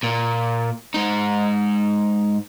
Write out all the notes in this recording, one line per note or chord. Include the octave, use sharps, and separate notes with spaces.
A#2
G#2 D#4